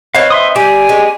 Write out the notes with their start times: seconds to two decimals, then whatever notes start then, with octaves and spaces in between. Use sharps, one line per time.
0.15 C4 D#4 B4 C#5 F5
0.30 E5 C6 D#6
0.56 G3 G4 G#5
0.89 G#3 B3 C#4